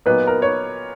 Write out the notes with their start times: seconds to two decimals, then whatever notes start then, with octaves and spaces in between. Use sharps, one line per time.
0.06 A#2 F#3 B3 D#4 B4
0.27 A#4
0.42 C#5